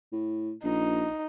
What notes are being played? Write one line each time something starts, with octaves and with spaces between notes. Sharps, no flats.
A2
A#1 D#4